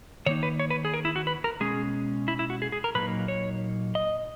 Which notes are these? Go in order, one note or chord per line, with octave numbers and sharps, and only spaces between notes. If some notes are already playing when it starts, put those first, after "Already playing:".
D#3 A#3 D#4 C#5
B4
C#5
B4
G#4
A#4
E4
F#4
B4
A#4
B2 G#3 C#4 G#4
E4
E4
F#4
G#4
G#4
A#4
A#2 F#3 A#3 D#4 B4
C#5
D#5